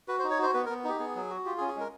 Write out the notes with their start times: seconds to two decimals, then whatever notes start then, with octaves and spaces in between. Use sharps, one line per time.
0.08 F#4 B4
0.19 C5
0.24 D#4
0.30 C#5
0.38 F#4 C5
0.54 B3 B4
0.66 B3 A#4
0.84 D#4 G4
0.99 B3 G#4
1.15 F#3
1.30 F#4
1.45 F4 G4
1.58 G#4
1.60 C#4
1.68 G#4
1.76 G#3 A#4